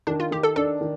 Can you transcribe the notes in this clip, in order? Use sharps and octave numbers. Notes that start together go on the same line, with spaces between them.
D#3 D4
F4
D#3 G4
A4
D4 A4
D#3